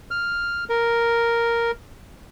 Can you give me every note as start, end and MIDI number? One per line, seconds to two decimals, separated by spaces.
0.11 0.64 89
0.69 1.71 70